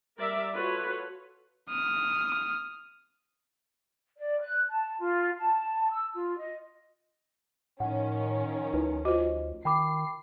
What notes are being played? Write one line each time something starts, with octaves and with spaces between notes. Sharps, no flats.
G3 A#4 D5 E5
F4 F#4 A4 B4 C#5
D#6 F6
D5
F#6
A5
F4
A5
E6
F4
D#5
A2 D#3 F3 C#4 F#5
D2 D#4 E4 B4
F4 F#4 C5 D#5
D#3 G5 B5 D6 C7